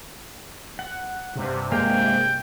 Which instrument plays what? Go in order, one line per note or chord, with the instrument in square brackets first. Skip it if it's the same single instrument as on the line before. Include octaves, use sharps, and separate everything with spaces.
[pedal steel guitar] F#5
[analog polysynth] G2 C3
[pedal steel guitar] G#3 A#3 F5 [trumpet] G5